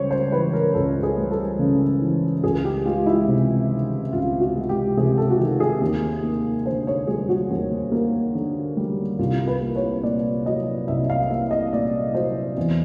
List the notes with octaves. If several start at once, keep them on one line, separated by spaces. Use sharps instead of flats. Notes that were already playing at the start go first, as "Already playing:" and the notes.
Already playing: C#2 C#3 G3 C5 C#5
C5
E3 B4
A#4
C#2 A4
G#4
G3
A4
C#3
E3
C#2 G#4
G4
G#3 F4
E4
C3
D#3
C#2 F4
F#4
G#3
G4
C3 G#4
A4
F#4
D#3 G4
G#4
D#2
A#3
D3 C5
C#5
G3 G#4
F#4
D#2
A#3
D3
G3
C2 F4
B4
A#3
C#5
A#2 D5
F#3 D#5
C2 E5
F5
F5
A#3 E5
D#5
A#2 D5
F#3 C5
E2